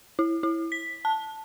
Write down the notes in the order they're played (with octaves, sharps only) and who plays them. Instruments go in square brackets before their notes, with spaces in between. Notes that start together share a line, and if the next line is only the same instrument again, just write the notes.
[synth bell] E4
E4
B6
A5